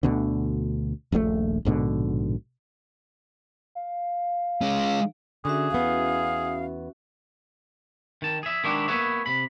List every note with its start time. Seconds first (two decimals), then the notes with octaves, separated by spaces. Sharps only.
0.03 D2 B2 D3
1.12 D#1 A#1 C3 A3
1.65 A#1 G#2 B2 D3
3.75 F5
4.61 G#3 C#4
5.45 D3 C#4 F#4 G#4 E5
5.71 E2 B3 F5
8.22 D#3 A5
8.43 G#4 E5
8.64 D#3 G#3 D4 E4 F#4 G4
8.88 A#3 B3 G#4 B4 C#5 E5
9.26 C3 B5